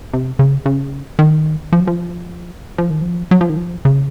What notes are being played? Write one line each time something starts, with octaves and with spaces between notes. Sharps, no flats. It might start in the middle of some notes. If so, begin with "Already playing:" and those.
C3
C#3
C#3
D#3
F3
F#3
F3
F3
D#3
F3
F#3
F3
D#3
F3
C#3